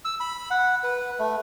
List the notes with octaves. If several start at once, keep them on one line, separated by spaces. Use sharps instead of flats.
E6
B5
F#5
B4
A3